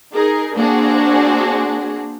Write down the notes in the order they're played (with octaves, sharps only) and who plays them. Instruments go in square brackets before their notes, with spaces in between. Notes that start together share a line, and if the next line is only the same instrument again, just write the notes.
[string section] D#4 G#4 A#4
A#3 C4 D4 F#4 G#4